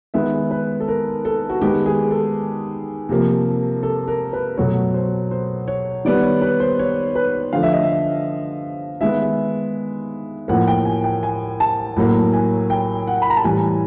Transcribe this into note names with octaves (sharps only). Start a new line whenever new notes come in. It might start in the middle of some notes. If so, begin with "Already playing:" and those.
D#3 G#3 B3 E5
B4
A4
A#4
A4
F#4
D#3 G#3 B3 G4
G#4
A4
C3 F3 A#3
A4
A#4
B4
B2 F#3 A3 C#5
C5
C5
C#5
D#3 G3 B3 D5
C#5
B4
C5
C#5
B4
D3 F3 A3 F5
E5
D#5
E5
D#3 G#3 B3 E5
A2 F3 A#3 F#5
G5
G#5
G5
G#5
A5
A2 F#3 A#3
G#5
G5
F#5
B5
A#5
A5
A2 E3 G3 G#5